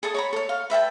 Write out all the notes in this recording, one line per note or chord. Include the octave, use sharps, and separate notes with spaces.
G#4 A4 A5 D#6
C#5 A#5 B5
A4 C#5
F5
B4 E5 G5 A5